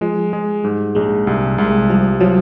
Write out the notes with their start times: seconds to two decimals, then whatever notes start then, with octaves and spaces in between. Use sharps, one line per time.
0.01 F3 G#3
0.33 G#3
0.64 G#2 G3
0.95 A#1 G#3
1.27 C2 G3
1.58 C2 G#3
1.89 F3 G3
2.20 F3 F#3